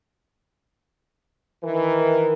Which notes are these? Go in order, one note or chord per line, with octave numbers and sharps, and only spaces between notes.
D#3 E3 A#4